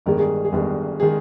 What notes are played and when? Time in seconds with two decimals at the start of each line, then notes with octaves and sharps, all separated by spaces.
0.06 G1 G2 D#3 G#3 A#4
0.19 G#4
0.45 G#4
0.52 G1 G2 D#3 G#3
1.00 D#3 G#3 G#4